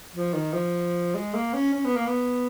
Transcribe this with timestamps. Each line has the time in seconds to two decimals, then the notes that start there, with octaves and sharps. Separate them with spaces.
0.13 F3
0.33 D#3
0.53 F3
1.14 G#3
1.34 A#3
1.53 C#4
1.74 C#4
1.85 B3
1.96 A#3
2.07 B3